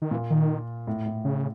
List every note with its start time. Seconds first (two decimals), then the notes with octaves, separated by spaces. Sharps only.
0.02 D#3
0.11 A#2 E3
0.30 D#3
0.87 A2
1.06 A2
1.25 C#3